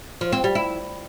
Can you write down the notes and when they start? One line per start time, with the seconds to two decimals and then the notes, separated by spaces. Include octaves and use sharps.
0.21 F3
0.32 C4
0.44 G3
0.55 E4